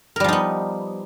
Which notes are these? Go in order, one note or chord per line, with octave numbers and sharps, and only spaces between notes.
F3 G3 B3 D#4 A#4